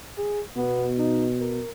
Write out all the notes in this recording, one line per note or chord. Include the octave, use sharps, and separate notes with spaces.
G#4
B2 B3
D#4
A#4